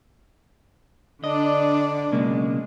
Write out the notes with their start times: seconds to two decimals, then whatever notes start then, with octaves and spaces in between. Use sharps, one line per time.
1.24 D3 D4 D5 D#5
2.12 B1 C#3 G#3 A#3